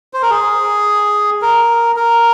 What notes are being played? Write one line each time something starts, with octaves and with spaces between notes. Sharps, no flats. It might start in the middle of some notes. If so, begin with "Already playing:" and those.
C5
A#4
G#4
A#4
A#4